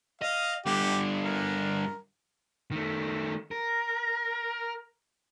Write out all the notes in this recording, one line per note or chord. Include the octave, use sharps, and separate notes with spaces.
D#5 F5
G2 D3 G4
A#4
D#3 A3
A#4